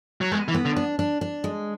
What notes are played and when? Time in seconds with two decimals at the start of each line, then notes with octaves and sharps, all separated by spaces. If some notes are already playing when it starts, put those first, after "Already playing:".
0.21 F#3
0.32 G#3 B3
0.48 E3
0.55 B3
0.65 D3
0.77 D4
0.99 D4
1.21 D4
1.44 G#3